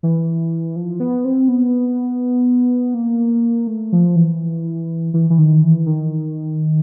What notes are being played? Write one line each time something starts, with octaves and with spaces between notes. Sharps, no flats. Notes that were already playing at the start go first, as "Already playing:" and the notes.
E3
F3
B3
C4
B3
A#3
A3
F3
E3
E3
E3
D#3
E3
D#3